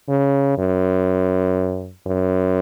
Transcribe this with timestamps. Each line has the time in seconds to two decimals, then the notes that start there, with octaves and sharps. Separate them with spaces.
0.09 C#3
0.58 F#2
2.07 F#2